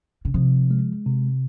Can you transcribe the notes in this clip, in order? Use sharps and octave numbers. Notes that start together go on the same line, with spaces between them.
C#3
C3 F3
G#3
C3